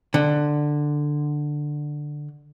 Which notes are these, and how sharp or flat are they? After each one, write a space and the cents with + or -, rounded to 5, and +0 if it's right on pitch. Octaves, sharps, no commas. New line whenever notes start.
D3 +10